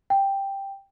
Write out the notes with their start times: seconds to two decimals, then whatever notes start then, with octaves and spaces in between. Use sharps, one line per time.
0.10 G5